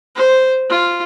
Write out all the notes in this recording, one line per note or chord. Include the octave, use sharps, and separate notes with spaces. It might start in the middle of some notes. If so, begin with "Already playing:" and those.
C5
F4